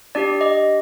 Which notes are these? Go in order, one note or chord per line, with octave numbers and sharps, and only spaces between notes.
D4 G4 D5
D#5